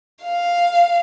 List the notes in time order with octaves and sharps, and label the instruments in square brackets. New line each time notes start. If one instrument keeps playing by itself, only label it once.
[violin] F5